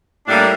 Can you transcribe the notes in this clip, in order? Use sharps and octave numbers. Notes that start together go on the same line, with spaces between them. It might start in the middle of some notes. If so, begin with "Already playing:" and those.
A2 G3 A#3 D4